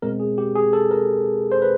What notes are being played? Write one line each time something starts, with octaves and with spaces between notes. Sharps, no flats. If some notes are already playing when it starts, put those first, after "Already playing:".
B2 G#3 C4 A#4
G#4
G4
G#4
A4
A#4
C5
B4